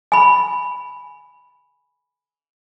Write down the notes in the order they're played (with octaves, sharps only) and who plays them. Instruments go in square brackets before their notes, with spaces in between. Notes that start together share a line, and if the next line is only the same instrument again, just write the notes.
[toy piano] G#5 B5